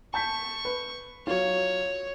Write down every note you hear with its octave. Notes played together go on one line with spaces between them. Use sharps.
A5 C#6 G6 B6
B4
F#3 F4 C#5